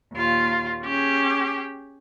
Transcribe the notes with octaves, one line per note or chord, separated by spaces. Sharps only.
D#2 A#2 F4
C#4 G4 G#4